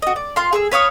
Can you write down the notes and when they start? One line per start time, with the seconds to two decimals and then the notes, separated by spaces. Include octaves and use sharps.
0.02 F#4 D#5
0.16 D5
0.36 F4 F5 C6
0.53 G#4 C6 E6
0.71 B4 C#5 F5 D#6